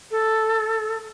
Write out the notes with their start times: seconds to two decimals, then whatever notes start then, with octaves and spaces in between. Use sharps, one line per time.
0.11 A4